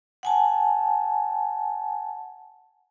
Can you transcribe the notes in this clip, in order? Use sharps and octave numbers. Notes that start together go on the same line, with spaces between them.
F#5 G#5 A5